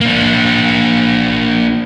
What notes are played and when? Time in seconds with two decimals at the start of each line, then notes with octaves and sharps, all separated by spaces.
0.01 A#3 D4